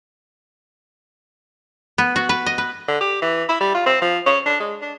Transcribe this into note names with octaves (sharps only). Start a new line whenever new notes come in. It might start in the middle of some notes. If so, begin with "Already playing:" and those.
B3
F#4
B4
D#5
B4
D3
G4
E3
E4
G3
F4
C4
F3
C#4
D4
G#3
D4